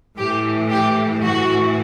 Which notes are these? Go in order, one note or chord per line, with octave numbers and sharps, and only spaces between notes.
A2 E3 G4
G4
A2 E3 F#4